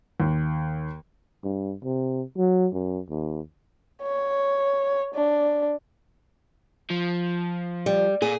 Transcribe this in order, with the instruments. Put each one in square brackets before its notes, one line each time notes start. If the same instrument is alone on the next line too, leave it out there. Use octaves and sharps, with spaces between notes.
[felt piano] D#2
[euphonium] G2
C3
F#3
F#2
D#2
[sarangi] C#5
D4
[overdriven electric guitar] F3
[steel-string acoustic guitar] G3
[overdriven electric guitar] A#2 [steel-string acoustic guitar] G#4